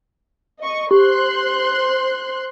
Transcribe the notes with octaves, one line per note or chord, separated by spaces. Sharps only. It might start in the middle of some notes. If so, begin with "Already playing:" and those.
D#5 C#6
G4 C5 C6 F#6